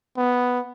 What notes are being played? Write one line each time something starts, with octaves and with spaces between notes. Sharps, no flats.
B3